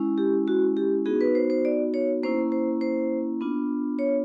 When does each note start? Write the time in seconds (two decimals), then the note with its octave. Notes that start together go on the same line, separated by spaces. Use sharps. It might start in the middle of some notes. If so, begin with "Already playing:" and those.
Already playing: G#3 C#4 E4
0.18 G4
0.48 F#4
0.77 G4
1.06 B3 D#4 F#4 G#4
1.21 B4
1.35 C5
1.50 C5
1.65 D5
1.94 C#5
2.23 A#3 C#4 E4 C5
2.52 C5
2.81 C5
3.41 B3 D4 F4
3.99 C#5